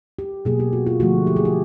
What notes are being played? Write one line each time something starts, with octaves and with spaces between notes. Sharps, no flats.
G4
B2 F#3 A#3 G#4
G4
F#4
F4
D3 F3 A3 F#4
G4
G#4
G4